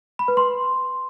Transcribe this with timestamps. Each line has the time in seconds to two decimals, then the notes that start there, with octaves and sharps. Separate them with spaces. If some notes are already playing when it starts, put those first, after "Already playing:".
0.19 B5
0.28 B4
0.37 C6